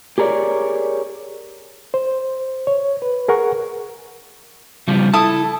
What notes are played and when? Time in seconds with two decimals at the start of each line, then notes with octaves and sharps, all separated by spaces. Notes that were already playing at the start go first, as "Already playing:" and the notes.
0.18 G4 G#4 A#4 C#5 D5
1.94 C5
2.67 C#5
3.02 B4
3.28 G#4 A#4 F#5 C#6
4.88 C#3 F3 G3
5.14 E4 A4 A5 D#6